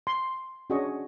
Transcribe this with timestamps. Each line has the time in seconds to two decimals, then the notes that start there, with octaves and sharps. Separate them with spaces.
0.07 C6
0.70 C#4 D4 F#4 G#4 D#5 C#6